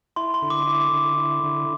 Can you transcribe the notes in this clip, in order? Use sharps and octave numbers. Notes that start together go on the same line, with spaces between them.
E4 C6
C6
D3
D6
E4
D3
E4
D3